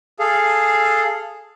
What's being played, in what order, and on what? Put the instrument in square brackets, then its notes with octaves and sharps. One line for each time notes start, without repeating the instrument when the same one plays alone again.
[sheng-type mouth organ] G#4 A4 F5